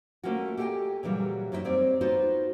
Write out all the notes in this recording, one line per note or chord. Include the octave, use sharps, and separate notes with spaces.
A3 A#3 C#4 F4 F#4
G4 A4 D#5 F5 G5 G#5
A#2 C#3 E3 F#3 G3
F#2 C#4 D#4 E4 A4 E5
G3 C4 C#5 D5
B3 D#4 F4 F#4 C5